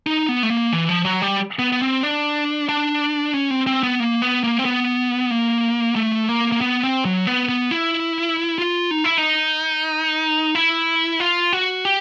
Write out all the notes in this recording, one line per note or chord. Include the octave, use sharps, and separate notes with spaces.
D#4
B3
A3
A#3
E3
F3
F#3
G3
B3
B3
C4
D4
D4
C#4
C4
C4
B3
A#3
B3
A#3
C4
B3
A#3
A3
A#3
A#3
B3
C4
F#3
B3
B3
E4
F4
D#4
E4
D#4
E4
F4
F#4
G4